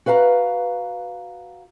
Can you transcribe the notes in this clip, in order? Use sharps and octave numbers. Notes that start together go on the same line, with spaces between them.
F#4 B4 F5 A5 A#5